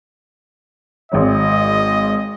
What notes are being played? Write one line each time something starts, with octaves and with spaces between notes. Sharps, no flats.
G#1 G#2 C#5 D#5